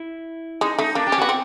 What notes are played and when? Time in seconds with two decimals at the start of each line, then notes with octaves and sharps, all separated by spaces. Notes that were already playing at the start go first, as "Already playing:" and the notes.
Already playing: E4
0.61 G#3 D#4
0.79 A3 D#4
0.95 A#3 D4
1.07 G4
1.12 C#4
1.18 B3 F#4
1.29 C4